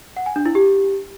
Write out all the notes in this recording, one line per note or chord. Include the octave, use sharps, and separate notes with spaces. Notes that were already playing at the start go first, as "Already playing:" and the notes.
F#5
G#5
D4
E4
G4